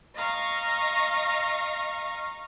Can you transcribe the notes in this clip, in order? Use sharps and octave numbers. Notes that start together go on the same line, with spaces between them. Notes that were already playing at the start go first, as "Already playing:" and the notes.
D#5 F5 A#5 C#6